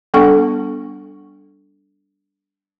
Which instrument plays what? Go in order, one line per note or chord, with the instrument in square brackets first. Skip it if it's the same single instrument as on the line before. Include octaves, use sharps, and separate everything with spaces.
[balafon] G3 B3 D4 A4 F#5 C#6